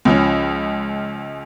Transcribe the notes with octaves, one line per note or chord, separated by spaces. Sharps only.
C#2 F3 C#4